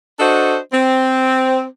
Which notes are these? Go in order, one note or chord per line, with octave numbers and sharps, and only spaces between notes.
D4 F#4 A4 C5 D#5
C4